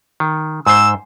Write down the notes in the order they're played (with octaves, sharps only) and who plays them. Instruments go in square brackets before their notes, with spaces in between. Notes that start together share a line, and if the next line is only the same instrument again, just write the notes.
[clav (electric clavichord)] D#3
[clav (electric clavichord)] G#2 C5 [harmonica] E6